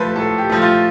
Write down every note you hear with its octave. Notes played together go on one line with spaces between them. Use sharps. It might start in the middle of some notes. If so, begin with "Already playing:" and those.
Already playing: A2 F3 A3 B4 C5
A2 A4
G4
F3 A3
F4